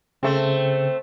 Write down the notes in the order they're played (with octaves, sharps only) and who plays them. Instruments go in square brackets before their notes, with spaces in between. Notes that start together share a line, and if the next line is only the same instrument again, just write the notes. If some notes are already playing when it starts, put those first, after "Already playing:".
[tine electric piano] C#3 [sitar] A3 C4